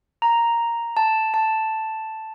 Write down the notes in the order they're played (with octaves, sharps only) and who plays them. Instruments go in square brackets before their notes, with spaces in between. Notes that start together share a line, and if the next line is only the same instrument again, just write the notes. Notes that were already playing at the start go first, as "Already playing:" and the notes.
[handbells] A#5
A5
A5